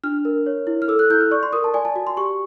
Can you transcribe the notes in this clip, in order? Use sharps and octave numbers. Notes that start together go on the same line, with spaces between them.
D4 F6
A#4
C#5
E4
F6
A4 E6
F#6
E4 G6
F6
D5 C#6
C6
A#4 D#6
A5
D5 G#5
A5
F#4
C6
G4 C#6